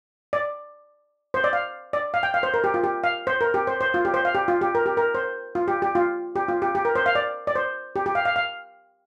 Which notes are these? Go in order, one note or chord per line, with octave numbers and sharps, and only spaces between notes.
D5
C5
D5
F5
D5
F5
G5
F5
C5
A#4
G4
F4
G4
F5
C5
A#4
G4
C5
C5
F4
G4
C5
F5
G4
F4
G4
A#4
G4
A#4
C5
F4
G4
G4
F4
G4
F4
G4
G4
A#4
C5
F5
D5
D5
C5
G4
G4
F5
F5
F5